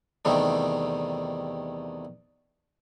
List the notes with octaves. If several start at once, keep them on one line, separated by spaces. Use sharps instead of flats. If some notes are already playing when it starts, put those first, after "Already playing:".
E2 C3 D#3 G3 A3